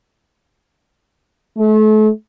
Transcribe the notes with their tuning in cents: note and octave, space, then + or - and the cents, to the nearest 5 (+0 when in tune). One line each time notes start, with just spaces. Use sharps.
A3 -35